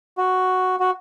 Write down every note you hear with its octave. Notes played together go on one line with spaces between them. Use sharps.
F#4
F#4